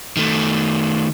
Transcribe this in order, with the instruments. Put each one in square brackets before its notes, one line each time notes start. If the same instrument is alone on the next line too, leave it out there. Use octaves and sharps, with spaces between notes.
[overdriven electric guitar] D#3 A3